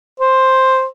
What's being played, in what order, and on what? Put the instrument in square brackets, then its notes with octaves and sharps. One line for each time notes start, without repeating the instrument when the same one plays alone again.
[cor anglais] C5